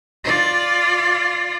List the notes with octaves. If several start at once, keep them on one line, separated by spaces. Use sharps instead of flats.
F4 D5